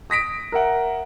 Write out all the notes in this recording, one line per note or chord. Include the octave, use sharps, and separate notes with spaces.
D#6 A#6 B6 D7
A#4 E5 F#5